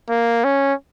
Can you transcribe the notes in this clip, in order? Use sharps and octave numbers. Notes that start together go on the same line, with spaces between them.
A#3
C#4